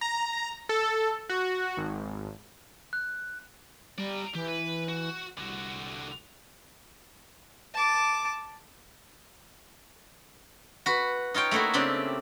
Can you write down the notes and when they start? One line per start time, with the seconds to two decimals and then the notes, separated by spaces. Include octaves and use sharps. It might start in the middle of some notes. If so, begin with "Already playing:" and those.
0.01 A#5
0.69 A4
1.30 F#4
1.77 G#1
2.93 F#6
3.98 G3 D5 A#5
4.35 E3 G4
4.48 B4
4.89 F#4
5.38 C2 D3 F#4
7.74 A5 D6
10.86 F#4 B4
11.34 D#4 F4 C#5 G5
11.51 A3 A#3 D#4 E4 F#4
11.74 C#3 C4 D4 G4